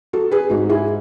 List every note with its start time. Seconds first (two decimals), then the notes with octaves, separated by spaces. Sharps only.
0.13 F#3 F#4 A4
0.31 G#4 B4
0.50 G#2 D#4 F#4
0.69 E4 G#4